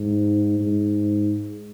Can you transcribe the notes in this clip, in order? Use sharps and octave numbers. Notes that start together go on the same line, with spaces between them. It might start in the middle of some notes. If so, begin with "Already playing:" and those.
Already playing: G#2
G#2